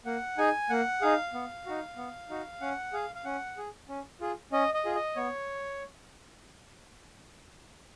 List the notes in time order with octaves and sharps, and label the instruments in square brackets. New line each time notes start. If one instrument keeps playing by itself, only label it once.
[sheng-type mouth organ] A#3 F#5
D#4 G#4 G#5
A#3 F#5
D#4 G#4 F5
B3
D#4 F#4
B3
D#4 F#4
C#4 F#5
G#4 F5
F5
C#4 F#5
G#4
C#4
F4 G#4
C#4 D#5
D#5
F4 G#4
D#5
B3 C#5